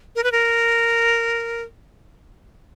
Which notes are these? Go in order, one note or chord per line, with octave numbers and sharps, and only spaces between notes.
A#4
B4
A#4